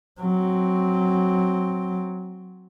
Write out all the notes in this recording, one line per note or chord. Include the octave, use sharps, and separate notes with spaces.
F#3 C4